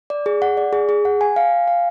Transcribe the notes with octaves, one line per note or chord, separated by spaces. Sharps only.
D5
G#4
F#5
D5
G#4
G#4
F#5
G#5
F5
G#5
F5